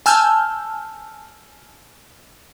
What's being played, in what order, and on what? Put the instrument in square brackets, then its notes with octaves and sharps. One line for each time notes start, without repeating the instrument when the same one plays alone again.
[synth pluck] G#5 A5 E6 F6 G6